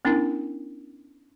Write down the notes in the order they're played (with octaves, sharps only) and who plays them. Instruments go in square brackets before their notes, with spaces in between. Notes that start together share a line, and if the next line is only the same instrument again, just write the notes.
[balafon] B3 C#4 D4 E4 A#4